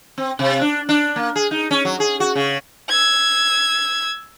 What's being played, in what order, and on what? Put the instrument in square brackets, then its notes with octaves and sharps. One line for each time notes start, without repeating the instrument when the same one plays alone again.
[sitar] C4
C3
D4
D4
A#3
G#4
D#4
C#4
F#3
G#4
F#4
C#3
[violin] E6 G#6